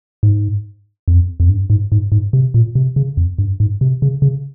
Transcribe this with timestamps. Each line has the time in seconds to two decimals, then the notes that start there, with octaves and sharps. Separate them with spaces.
0.23 G#2
1.08 F2
1.40 F2
1.49 G2
1.70 G#2
1.92 G#2
2.12 G#2
2.33 C3
2.54 A#2
2.75 C3
2.96 C#3
3.17 F2
3.38 G2
3.60 G#2
3.81 C3
4.02 C#3
4.22 C#3